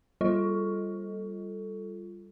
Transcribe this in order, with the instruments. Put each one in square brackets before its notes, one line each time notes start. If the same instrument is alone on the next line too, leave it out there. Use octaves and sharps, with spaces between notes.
[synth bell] G3 F4 A4